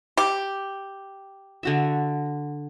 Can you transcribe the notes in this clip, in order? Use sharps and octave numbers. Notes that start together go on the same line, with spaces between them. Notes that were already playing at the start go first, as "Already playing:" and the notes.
G4
D3 F#4 E5